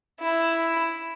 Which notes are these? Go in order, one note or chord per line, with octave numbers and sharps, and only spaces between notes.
E4